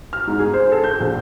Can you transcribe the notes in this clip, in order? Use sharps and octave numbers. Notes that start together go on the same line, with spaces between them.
F6
G#2
G#4
C5
A4
G6
A#1